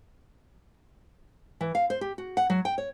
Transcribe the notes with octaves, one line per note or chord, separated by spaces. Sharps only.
E3
F5
C5
G4
F#4
F#5
F#3
G5
C#5